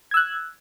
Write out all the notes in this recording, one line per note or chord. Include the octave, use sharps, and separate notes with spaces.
E6 F#6 G#6